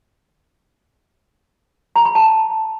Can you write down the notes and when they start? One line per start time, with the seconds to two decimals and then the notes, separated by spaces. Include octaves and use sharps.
1.96 A#5
2.05 B5
2.15 A5